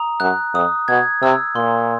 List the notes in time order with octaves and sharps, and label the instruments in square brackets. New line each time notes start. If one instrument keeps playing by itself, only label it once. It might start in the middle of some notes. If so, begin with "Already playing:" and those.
Already playing: [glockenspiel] A#5 D#6
[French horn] F#2 [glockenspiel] F#6
[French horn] F2 [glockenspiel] D#6
[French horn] B2 [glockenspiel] G#6
[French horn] C3 [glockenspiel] E6
[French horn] A#2 [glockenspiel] C6